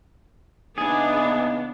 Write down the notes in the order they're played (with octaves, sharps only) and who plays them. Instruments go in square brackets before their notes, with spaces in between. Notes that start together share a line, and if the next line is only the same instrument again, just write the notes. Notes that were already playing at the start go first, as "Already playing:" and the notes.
[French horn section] C#3 E3 D#4 [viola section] B3 D4 [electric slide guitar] G#4